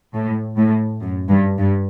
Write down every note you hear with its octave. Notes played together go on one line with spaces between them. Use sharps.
A2
A2
F#2
G2
G2